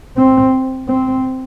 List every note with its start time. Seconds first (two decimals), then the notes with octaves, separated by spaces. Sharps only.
0.17 C4
0.88 C4